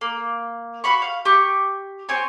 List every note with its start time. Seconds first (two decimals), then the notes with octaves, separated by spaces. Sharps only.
0.01 A#3
0.84 F#4 F5 B5 C#6
1.02 F5
1.25 G4 C#6
2.09 C4 C#5 G#5 C#6